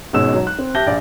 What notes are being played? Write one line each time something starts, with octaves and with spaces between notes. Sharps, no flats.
G#1 B2 G#3 C#4 E6 E7
F#3
F#6
C4
G4 E5 A5 G6 A#6 G7
A#1 D5 F5